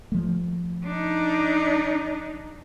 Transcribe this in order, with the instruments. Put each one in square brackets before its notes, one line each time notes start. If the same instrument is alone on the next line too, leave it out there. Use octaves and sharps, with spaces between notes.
[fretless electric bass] F3 A3
[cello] D4 D#4